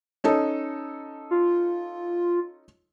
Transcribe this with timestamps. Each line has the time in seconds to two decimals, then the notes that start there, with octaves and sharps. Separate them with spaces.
0.24 C#4 D#4 A4
1.31 F4